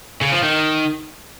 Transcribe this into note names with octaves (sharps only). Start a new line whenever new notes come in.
C#3
F3
D#3